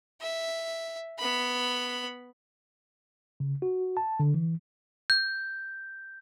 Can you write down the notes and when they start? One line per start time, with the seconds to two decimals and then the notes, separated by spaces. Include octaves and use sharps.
0.21 E5
1.19 B3 B5
3.40 C#3
3.62 F#4
3.97 A5
4.20 D3
4.34 E3
5.10 G6